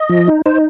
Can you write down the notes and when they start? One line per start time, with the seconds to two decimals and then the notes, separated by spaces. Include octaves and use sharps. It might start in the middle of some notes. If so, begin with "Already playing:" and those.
Already playing: D#5
0.09 F3
0.28 D#4
0.46 D#4 C5